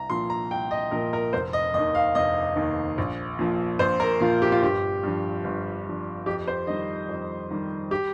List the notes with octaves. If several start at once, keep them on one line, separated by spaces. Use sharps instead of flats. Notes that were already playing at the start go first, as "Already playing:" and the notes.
Already playing: C2 A#5
A#2 F3 C6
A#5
C2 G5
D#5
A#2 F3 A#4
A#4
F1 C5
D#5
D#2 D#3 D#5
F5
F1 D#5
D#2 D#3
A#1
A#2 F3
A#1 C5
A#4
A#2 F3 F4
G4
F4
G1 G4
G2 F3
G1
G2 F3
F2 G4
C5
D#3 G3 D#5
F2
D#3 G3
G4